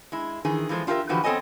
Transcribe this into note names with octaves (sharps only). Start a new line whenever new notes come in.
G#3 E4
D#3 E3 G#4
E3 F3 G#3 A4 C5
D4 F4 G4 A4 A#4 E5
D3 E3 F3 F#4 G4 B4
B3 C4 A4 C#5 D#5 G#5